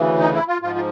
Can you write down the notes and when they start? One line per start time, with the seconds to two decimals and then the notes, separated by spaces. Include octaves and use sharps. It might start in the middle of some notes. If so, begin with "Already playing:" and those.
Already playing: D2 C#3 E3
0.20 D#4
0.34 E4
0.48 F4
0.62 G#2 F3 F4
0.75 F4